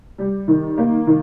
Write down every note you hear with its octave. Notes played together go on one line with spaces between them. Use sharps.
G3
D#3
A#3
D#3